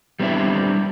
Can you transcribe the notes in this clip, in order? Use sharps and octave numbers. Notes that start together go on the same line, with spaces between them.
G3 B3 C4 D4 E4